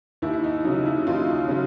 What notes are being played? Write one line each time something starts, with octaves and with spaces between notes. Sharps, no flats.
D#2 E4
E4
D#4
C#3 F#3 D#4
E4
D#2 D#4 F4
C#3 F#3